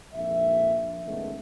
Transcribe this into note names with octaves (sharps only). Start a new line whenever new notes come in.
A#1 F2 G#2 E5
C#2 A2 D#3 G#3 A3 B3